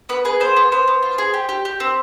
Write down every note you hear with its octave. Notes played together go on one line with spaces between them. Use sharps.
B3 B4
G#4 B4
B3 C5
B3
B3 C5
B3
F4
G#4
G4
G4
G4
C4